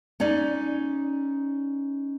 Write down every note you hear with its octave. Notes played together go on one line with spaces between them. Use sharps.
C#4 D#4 C#5 D5